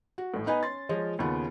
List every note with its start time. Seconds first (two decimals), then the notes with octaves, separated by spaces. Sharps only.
0.18 F#4
0.34 A1 A2
0.46 B3 D#4 B4 D#5 G#5
0.63 C#4 C6 A6
0.89 F3 G#3 F4 C#5 D#5
1.19 D#2 C#3 B3 F4